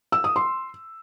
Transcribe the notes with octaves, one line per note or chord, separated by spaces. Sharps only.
E6
D#6
C6